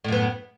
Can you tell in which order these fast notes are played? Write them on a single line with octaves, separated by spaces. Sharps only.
A2 F#2 B3